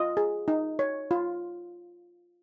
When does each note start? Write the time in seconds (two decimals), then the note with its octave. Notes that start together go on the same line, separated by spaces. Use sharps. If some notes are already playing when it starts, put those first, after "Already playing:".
Already playing: F4 D#5
0.17 G#4
0.48 D#4
0.79 C#5
1.11 F4